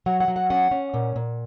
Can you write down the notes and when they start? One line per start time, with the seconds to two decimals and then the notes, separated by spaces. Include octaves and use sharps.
0.06 F#3 F#5
0.20 F#5
0.28 F#3
0.36 F#5
0.50 C#4 F#5
0.71 C#4
0.94 A#2
1.16 A#2